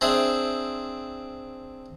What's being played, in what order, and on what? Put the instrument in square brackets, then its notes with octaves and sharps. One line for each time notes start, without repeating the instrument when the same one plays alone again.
[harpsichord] C4 D4 G#4 E5